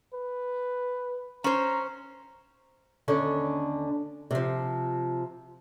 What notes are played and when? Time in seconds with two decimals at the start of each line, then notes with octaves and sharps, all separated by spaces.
0.14 B4
1.44 C#4 C5 A#5
3.08 D#2 D3 C#4 D4
4.31 C3 F3